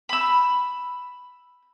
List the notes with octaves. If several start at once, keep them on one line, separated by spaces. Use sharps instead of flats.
B5 E6